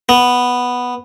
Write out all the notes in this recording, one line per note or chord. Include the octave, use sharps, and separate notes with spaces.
B3